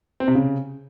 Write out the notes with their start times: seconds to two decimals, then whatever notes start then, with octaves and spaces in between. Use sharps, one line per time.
0.20 C4
0.28 C3
0.35 C#3